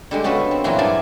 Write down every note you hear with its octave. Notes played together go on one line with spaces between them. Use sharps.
D3 G3 G#3
C#3 B3 F#4 A4 B4
C4
A#2 E3 F#3 E4 F4
G2 B3 G#4 D5 A5